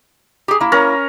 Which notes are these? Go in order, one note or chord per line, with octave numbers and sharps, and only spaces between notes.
G4 G#4
A#3 E4
C#4 A#4